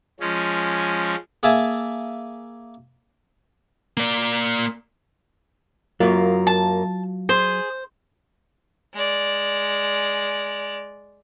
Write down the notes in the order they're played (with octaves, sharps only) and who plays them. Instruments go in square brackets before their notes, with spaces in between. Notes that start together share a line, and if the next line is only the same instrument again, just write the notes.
[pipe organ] F3 G#3 C#4
[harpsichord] A#3 G#4 E5 G#5 A5
[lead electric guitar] A#3 D5
[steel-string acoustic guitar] F#2 A#3 [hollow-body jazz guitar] F#3 F4
[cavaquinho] A5
[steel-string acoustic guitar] G#4 [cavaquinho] C5
[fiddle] G#3 D5